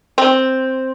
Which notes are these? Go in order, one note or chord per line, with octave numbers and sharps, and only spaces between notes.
C4